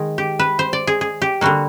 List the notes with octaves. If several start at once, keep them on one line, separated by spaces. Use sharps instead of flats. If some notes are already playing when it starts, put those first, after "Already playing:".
Already playing: D#3 G#3
G4
B4
C5
D5
G#4
G#4
G4
D3 G3 A#3 F#4